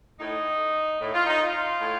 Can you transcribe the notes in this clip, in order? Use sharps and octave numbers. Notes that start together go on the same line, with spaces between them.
A2 D#4
A2
F4
D#4
F4
A2